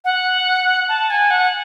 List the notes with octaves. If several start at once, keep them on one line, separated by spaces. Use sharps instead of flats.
F#5
A5
G#5
F#5